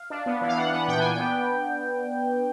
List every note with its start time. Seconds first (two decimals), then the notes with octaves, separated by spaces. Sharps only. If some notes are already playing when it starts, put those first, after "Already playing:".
Already playing: F5
0.10 D4
0.26 B3
0.41 E3
0.48 F5
0.56 D4 F#5
0.72 B3 F#5
0.88 A#2 G5
0.99 D4 G#5
1.12 G5
1.19 B3